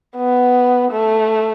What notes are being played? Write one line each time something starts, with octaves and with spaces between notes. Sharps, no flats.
B3
A3